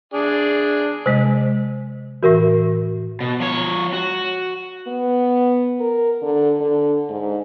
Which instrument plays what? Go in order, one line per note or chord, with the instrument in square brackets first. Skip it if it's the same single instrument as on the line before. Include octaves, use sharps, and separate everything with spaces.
[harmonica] D4 G#4
[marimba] C3 G#3 D#5 [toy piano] C5
[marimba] A2 E3 [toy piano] F#4 A#4 E5
[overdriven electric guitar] B2
F3 C#5
F#4
[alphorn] B3
A#4
D3
D3
G#2